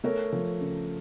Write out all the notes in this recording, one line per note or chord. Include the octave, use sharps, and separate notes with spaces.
A3 A#4 C#5
F3
C#3